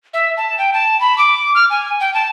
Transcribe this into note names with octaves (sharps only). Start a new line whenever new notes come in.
E5
A5
G5
A5
B5
D6
F6
G#5
G5
A5